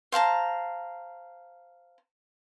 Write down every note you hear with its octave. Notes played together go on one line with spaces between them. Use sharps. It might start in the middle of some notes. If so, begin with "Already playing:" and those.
C5 F5 A5 A#5